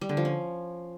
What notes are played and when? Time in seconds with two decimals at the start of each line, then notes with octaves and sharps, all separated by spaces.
0.01 G3
0.09 D3
0.17 F3
0.25 C#4